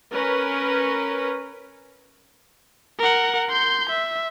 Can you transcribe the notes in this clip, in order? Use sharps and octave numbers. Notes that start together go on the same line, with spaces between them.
C#4 A#4 B4
A#4 F#5
C6 G6
E5